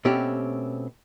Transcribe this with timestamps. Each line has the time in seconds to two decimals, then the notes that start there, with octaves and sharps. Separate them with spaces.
0.05 B2 A3 C4 C#4 G4